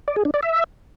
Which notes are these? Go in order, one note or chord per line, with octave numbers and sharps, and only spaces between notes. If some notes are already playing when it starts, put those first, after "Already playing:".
D5
G#4
D4
D5
E5